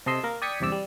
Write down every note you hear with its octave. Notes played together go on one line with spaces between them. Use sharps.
C3 A4 D#5 C6 E6
A#3 A#4
D5 G5 D#6 G#6 B6 C#7
E2 G2 C3 D5 E6
G3